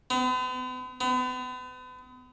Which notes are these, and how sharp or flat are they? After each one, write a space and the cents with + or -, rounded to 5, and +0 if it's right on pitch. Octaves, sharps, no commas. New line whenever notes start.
B3 +45
B3 +40